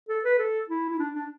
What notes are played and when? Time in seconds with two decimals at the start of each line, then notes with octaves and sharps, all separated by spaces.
0.09 A4
0.24 B4
0.39 A4
0.69 E4
0.90 E4
0.99 D4
1.15 D4